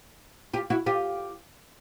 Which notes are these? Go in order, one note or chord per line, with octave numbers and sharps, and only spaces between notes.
F4 G4
E4 F#4
F4 G4